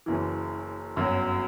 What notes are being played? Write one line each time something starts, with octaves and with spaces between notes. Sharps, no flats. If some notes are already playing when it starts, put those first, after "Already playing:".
F#1 F#2 E3
G1 F#2 F#3